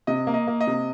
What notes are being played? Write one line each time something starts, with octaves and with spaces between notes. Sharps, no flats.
C3 D#5
A#3
D#5
A#3
D#5
C3